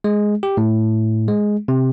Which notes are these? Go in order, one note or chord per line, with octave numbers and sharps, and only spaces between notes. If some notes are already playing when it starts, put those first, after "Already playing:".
G#3
G4
A2
G#3
C3